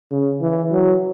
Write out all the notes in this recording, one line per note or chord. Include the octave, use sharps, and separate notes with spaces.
C#3
E3
F#3